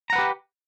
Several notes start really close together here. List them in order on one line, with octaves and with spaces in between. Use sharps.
A#5 F#5 B4 G4